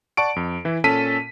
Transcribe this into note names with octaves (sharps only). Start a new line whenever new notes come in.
D5 F#5 A5 C#6 D7
F2
E3 E4
A#2 C#4 A4 A5 B6 D#7